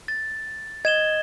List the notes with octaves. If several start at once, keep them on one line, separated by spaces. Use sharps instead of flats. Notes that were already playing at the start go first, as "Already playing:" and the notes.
A6
D#5 G#6 E7 G7